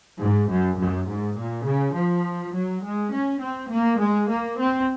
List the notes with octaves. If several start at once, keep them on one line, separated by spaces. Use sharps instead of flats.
G#2
F#2
F#2
G#2
A#2
C#3
F3
F#3
G#3
C#4
C4
A#3
G#3
A#3
C4